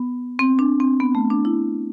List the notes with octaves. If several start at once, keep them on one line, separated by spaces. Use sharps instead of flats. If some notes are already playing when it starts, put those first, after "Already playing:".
Already playing: B3
C4
D4
C4
B3
A3
D4
E4